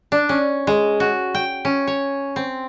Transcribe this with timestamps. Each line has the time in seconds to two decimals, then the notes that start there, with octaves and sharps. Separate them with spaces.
0.12 D4
0.29 C#4
0.67 G#3
1.00 F#4
1.35 G5
1.65 C#4
1.87 C#5
2.36 C4